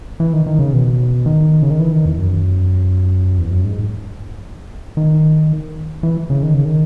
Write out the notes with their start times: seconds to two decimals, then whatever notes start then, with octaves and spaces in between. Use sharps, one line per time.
0.20 E3
0.33 D#3
0.46 D#3
0.59 C#3
0.73 B2
1.26 D#3
1.63 C#3
1.71 D#3
1.79 E3
1.92 D#3
2.05 E2
2.19 F#2
3.38 E2
3.51 F#2
3.65 G#2
4.97 D#3
6.03 E3
6.30 C#3
6.43 D#3
6.54 C#3
6.65 D#3